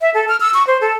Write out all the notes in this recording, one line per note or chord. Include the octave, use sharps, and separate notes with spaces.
E5
A4
F6
E6
C#6
C5
A4